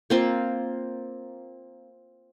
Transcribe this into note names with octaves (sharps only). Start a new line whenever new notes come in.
A#3 C4 F4